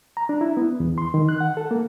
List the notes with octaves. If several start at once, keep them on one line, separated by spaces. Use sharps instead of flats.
A#5
D4
E4
B3
E2
C6
D#3
F#6
F#5
A4
A#3